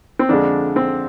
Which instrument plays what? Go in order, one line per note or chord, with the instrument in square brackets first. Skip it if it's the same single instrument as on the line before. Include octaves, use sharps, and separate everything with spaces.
[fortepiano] C4
F2 D3 G#3 D4
C4